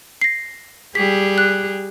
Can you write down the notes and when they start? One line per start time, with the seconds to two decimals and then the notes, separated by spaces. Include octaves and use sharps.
0.21 A#6 C7
0.95 G3 G4 G#4 B6
1.38 F#6